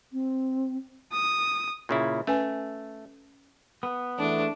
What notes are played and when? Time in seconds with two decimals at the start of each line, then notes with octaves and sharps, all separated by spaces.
0.13 C4
1.13 D#6
1.89 A#2 C#3 E4
2.27 A3 C#4 B4 G#5
3.83 B3
4.19 E2 A3 D4